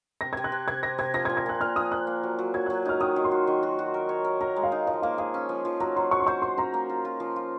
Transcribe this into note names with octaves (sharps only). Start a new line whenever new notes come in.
C3 A#6
C3 G#6
F#6
C3
C3 G#6
C3 A#6
C3 G#6
F3 A#6
G#6
A#2
G#6
A#2 F#6
A#2 F6
F3 D#6
A#3 F#6
A#3
F#3
F#3
F#3 G#6
F#3 F#6
D#4 F6
D#3 D#6
D#3
C6
F#4
D#3
F#4
F#4
A#4
C#5
A#4
A#4 A#5
G#3
F5
D#4
F3 D#5
A#3 F5
G#4 F5
C#4
F3
F3
F#3 A#5
F#3 C6
F#4 C#6
C6
C5 C#6
C5 C6
C#4 A#5
A#3
F4
F4
F3
F4